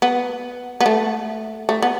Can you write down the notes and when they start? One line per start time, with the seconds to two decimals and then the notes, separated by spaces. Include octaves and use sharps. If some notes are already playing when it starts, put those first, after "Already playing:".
0.02 B3
0.81 B3
0.86 A3
1.69 A3
1.82 B3